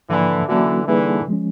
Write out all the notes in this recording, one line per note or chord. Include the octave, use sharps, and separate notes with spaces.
G#2 D3 E3 F3 A#3
D3 E3 F#3 A#3 C#4 F#4
D3 E3 G3 A#3 D#4 G#4 B4
F3 G#3 C#4